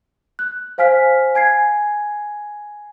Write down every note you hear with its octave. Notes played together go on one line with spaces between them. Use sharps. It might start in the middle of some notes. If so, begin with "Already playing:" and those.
F#6
C5 F5 G#5 F6 B6
G#5 G#6 C7